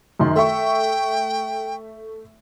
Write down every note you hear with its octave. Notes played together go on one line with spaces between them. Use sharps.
F#2 D#3 C6
A3 E5 G5 C#6